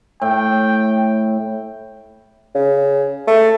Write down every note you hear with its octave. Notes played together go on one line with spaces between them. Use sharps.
A2 G5
C#3
A3